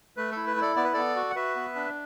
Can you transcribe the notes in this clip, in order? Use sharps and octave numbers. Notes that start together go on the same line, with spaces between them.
A3 B4
E4 A4
B4
E4 A4 D5
B3 D5
B4
B3 A4 D5
F#4
F#5
F#4 B4 E5
B3
D4